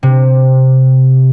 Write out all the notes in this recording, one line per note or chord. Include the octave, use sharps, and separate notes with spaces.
C3